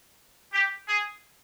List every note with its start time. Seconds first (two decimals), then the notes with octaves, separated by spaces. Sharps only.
0.53 G4
0.88 G#4